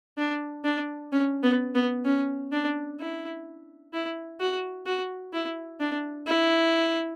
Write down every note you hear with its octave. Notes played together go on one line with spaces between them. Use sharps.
D4
D4
C#4
B3
B3
C#4
D4
E4
E4
F#4
F#4
E4
D4
E4